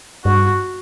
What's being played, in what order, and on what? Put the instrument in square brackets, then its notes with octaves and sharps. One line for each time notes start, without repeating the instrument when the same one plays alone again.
[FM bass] G2 [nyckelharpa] F#4